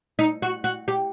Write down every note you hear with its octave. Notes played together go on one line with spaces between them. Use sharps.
D#4
F#4
F#4
G4